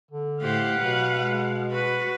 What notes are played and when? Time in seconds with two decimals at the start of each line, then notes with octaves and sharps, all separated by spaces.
0.11 D3
0.41 A2 G4 C5 F5 F#5
0.77 B2 F#3 B4
1.22 G#3
1.72 F#4 B4